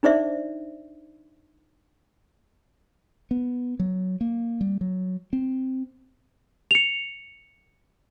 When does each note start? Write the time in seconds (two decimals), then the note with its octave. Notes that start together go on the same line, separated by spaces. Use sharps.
0.03 D4 D#4 C5 D5 E5
3.31 B3
3.79 F#3
4.21 A#3
4.61 G3
4.81 F#3
5.33 C4
6.71 C#7 F7